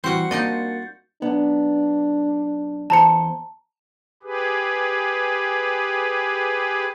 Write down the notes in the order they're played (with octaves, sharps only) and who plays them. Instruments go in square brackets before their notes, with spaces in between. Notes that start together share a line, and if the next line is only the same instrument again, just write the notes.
[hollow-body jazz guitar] E3 [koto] G3 C4 [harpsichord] F#4 C6 [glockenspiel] G6 C#7
[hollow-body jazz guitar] A#3 D4 F4 [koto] D#4 D5 D#5 [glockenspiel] G6 A6
[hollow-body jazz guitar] B1 B3 [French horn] D4
[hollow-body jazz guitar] E2 C5 [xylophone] A5 A#5 C#7
[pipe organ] G4 G#4 B4